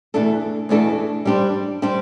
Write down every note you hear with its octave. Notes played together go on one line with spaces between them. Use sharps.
E2 B2 A3 D4 A4
E2 B2 A3 D4 A4
G3 D4 G4 C5
G3 D4 G4 C5